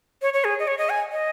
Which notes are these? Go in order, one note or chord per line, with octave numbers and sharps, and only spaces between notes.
C#5
C#5
G#4
D#5
C#5
D#5
G#5
D#5